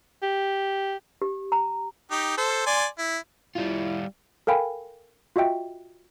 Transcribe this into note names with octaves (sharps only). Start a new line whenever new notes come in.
G4
G4
A#5
D#4 G4
A4 C5
D5 G#5 C6
E4
G3 E4 F4
A4 A#4 F5 G5 G#5 B5
F4 F#4 D#5 E5 G5